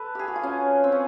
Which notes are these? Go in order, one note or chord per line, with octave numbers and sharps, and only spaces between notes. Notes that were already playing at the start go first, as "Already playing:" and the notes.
Already playing: A4 B4
G4 G#4
F#4
F4
C#4
C4
C#4